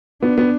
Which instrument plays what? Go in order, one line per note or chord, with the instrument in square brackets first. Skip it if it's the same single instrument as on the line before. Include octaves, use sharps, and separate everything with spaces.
[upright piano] B3 [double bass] D4
[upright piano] B3